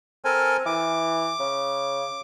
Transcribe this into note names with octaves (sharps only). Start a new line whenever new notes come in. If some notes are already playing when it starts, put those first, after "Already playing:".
C4 A4 A#4 G#5
E3 D6
C#3